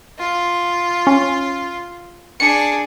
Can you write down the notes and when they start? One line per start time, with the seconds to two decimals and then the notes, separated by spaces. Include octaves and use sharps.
0.19 F4
1.07 C#4
2.40 D4 G#4 C#7